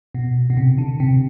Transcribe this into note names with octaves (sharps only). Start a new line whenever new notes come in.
B2
B2
C3
D3
C3